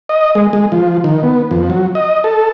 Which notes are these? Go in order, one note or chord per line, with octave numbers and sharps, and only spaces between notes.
D#5
G#3
G#3
F3
D#3
B3
F2
F#3
D#5
A4